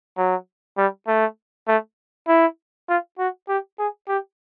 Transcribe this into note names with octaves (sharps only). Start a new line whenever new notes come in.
F#3
G3
A3
A3
E4
F4
F#4
G4
G#4
G4